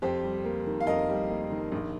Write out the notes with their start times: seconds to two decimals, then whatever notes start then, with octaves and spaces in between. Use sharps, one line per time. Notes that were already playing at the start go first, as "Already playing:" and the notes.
0.02 F2 G4 C5
0.23 G3
0.44 A#3
0.66 D#3
0.81 F5
0.87 F2 A#4 D#5
1.09 G3
1.30 A#3
1.51 D#3
1.72 A#1